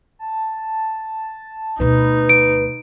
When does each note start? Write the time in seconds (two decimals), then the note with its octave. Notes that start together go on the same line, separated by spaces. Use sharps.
0.19 A5
1.80 D2 B2 D#4 B4
2.29 D7